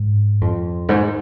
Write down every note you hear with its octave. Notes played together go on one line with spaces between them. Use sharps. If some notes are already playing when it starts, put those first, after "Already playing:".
Already playing: G#2
F2
G#2